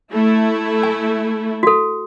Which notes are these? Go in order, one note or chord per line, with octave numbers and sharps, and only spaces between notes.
A3 E4
G#5
F#4 A4